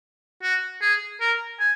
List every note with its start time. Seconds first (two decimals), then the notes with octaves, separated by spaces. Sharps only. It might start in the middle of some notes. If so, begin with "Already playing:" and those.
0.43 F#4
0.82 G#4
1.21 A#4
1.60 G#5